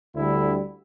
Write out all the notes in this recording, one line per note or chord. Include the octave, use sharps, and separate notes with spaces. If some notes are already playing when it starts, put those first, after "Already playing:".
D2 D3 G3 E4